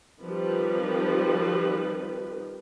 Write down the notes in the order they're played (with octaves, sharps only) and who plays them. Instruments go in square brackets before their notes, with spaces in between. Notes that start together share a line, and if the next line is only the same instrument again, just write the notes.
[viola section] D#3 F3 G3 C4 A#4 B4